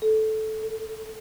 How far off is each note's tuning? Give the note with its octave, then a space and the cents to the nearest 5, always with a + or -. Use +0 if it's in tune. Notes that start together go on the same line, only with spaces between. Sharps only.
A4 -10
A4 +35